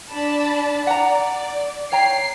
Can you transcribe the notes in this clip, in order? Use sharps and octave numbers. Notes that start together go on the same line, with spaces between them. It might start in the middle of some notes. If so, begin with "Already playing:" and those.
D4 A5 B5
D5 F#5 A#5
C#5 G5 A#5 C7